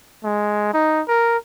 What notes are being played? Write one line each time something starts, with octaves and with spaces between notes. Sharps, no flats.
G#3
D#4
A#4